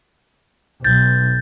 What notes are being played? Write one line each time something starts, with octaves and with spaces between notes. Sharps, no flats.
B1 G6 A6